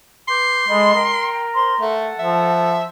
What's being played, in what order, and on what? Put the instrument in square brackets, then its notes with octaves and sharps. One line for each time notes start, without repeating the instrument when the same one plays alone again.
[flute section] B4 D6 G6 [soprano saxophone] C6
[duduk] G#3 [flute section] A4 D#5 B5
[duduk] A#4 [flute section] G5
[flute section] C5 C6
[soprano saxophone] A3 [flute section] A4 F#5
[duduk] F3 [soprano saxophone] E5